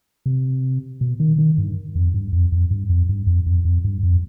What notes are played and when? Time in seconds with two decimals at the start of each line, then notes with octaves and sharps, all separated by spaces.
0.26 C3
1.01 B2
1.20 D#3
1.38 D#3
1.58 G2
1.95 F2
2.14 G2
2.32 F2
2.52 F2
2.71 G2
2.89 F2
3.09 G2
3.27 F2
3.46 F2
3.65 F2
3.84 G2
4.03 F2